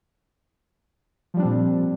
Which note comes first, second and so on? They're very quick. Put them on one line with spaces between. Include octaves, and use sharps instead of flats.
F3 G3 D4 C4 A#2